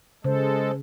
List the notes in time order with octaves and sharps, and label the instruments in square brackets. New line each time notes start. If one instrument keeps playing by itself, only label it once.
[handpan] C#3 [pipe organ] G#3 A4 [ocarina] C5